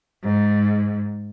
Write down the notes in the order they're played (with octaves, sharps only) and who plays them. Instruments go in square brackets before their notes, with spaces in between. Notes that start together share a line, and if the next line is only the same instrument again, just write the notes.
[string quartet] G#2